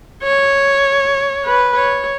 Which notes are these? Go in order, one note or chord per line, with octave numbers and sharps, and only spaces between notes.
C#5
B4
C#5